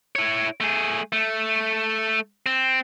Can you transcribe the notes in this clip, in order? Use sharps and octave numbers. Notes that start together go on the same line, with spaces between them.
E4 C#5
A3 G#4
A3
C4